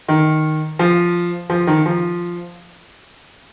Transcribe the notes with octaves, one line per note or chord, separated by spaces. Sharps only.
D#3
F3
F3
D#3
F3